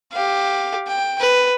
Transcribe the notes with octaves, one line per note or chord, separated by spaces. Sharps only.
G4 F5
G5
B4